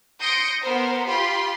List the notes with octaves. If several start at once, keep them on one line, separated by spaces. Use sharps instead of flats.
C6 D#6 G6 A#6 C#7 D7
B3 A#4 C5
F4 G4 B5 C6